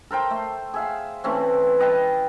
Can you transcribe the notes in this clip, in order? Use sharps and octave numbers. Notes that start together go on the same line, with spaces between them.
A4 A#4 C5 G5
A3
G#4 E5 F5
E3 A3 C4 C#4
B4 D#5 G5 A5